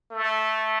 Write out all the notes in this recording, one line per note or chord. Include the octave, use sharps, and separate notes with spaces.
A3